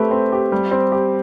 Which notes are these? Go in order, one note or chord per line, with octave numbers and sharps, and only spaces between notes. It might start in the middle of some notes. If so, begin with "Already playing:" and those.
Already playing: A3 C4 G4 B4
C4
G4
G3
C4
G4